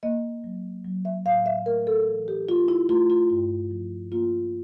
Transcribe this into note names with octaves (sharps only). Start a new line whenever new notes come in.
A#3 D#5
F#3
F#3
E5
A2 F5
E5
A3 A#4
A4
E3
G4
A3 F4
E4
A3 F4
F4
G2 F4
F3
A#3 F4